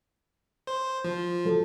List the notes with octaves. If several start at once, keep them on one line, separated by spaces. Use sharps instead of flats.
C5
F3
F#3 A4